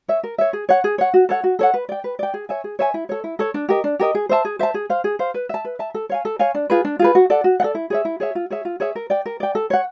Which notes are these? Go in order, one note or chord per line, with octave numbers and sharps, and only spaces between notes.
C#5 E5
A#4
C#5 E5
G#4
C#5 F#5
G#4
C#5 F#5
F#4
A4 C#5 F#5
F#4
A4 C#5 F#5
B4
D5 G5
B4
D5 G5
G#4
C#5 E5 G#5
G#4
C#5 E5 G#5
E4
A4 C#5
E4
A4 C#5
D4
G4 A#4 D#5
D4
G4 A#4 D#5
G#4
C5 E5 A5
G#4
C5 E5 A5
G#4
C5 F5
G#4
C5 F5
B4
E5 A5
B4
E5 A5
A4
C#5 F5 G#5
A4
C#5 F5 G#5
D4
F4 G#4 B4
D4
F4 G#4 B4
F#4
A4 D5 F#5
F#4
F#5
A4 D5
E4
G#4 C#5 E5
E4
G#4 C#5 E5
F4
G#4 C#5 E5
F4
G#4 C#5 E5
A#4
D5 G5
A#4
D5 G5
A4
C#5 F#5